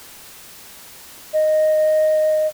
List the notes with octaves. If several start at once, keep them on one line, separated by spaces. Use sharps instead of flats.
D#5